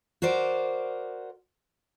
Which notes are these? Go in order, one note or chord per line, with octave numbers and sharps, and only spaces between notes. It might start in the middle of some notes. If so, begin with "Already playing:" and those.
F#4 A#4 C5 D5